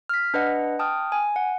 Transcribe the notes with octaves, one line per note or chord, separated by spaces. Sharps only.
F6 B6
D4 B4 D#5 F#5
G5 A5 D#6 F6
G#5
F#5